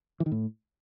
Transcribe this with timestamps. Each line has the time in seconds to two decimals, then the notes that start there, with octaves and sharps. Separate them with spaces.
0.20 E3
0.26 D#3
0.32 A2